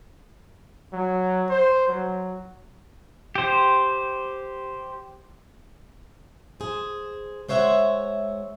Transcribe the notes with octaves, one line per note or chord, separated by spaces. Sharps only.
F#3
C5
F#3
G4 C5
G#4 C5
G#3 C5 C#5 E5 F#5